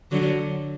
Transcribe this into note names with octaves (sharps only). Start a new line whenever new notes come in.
D3 F#3